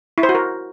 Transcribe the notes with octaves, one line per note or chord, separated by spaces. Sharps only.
E4
C5
F#4
A#4